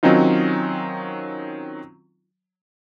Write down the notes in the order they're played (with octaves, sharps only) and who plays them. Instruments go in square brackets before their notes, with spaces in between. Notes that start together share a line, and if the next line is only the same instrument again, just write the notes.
[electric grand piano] D#3 F#3 C4 C#4 D#4 F4